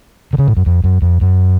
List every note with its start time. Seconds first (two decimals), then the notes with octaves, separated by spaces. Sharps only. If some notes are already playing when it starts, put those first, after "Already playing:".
0.33 D3
0.38 C#3
0.48 A2
0.57 F#2
0.66 F2
0.84 F#2
1.02 F2
1.21 F#2